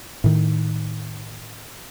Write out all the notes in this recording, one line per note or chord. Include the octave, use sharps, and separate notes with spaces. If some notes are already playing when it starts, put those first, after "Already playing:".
A2 D#3